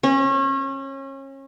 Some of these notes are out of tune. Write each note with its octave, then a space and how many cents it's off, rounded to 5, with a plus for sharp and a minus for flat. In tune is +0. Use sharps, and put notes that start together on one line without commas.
C#4 -30